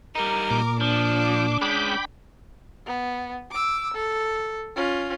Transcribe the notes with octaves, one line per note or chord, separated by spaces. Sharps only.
G3 D#4 A#4
A#2 D6
F3 D4
G#3 C#4 G5 B5 D6
B3
D6 E6
A4
C#4 F4